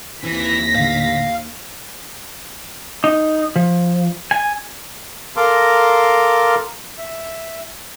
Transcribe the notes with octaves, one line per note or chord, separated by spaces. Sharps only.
D#2 E3 C4 A#6 B6
A2 D3 F5
D#4
F3
G#5
A4 A#4 F5 A#5 C6 D6
E5